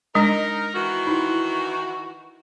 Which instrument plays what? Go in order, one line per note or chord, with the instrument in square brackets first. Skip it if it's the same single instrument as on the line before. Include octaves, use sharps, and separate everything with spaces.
[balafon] G#3 D4 D#5 [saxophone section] D#4 A#4
[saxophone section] D#3 E3 F#4
[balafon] D#4 E4